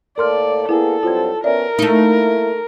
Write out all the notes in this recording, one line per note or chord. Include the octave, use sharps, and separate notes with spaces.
A2 A#3 A4 A#4 D5 C6 F6
A#3 B3 E4 G#4 A4
G2 F#3 C4 F4 G#6
B3 C#4 A#4 D5 E5
A3 A#3 D#4 E4